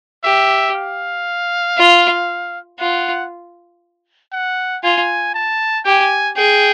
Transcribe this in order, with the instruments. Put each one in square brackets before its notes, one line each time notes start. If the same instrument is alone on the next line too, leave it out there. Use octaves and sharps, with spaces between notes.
[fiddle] G4 [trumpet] E5
[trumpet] F5
[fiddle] F4
[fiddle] F4 [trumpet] F#5
[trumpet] F#5
[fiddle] F4 [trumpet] G#5
[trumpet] A5
[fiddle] G4 [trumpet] G#5
[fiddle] G#4 [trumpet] G5